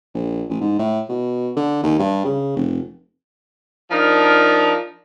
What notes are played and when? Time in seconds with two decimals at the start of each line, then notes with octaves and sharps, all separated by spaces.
0.15 A#1
0.50 A1
0.61 G#2
0.79 A2
1.09 B2
1.56 D3
1.83 D#2
1.99 G2
2.25 C#3
2.56 F1
3.91 F3 D4 D#4 A#4